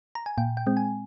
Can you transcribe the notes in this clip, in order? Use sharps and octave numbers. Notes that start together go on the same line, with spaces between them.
A#5
G#5
A#2 G5
G5
G#3 C4
G#5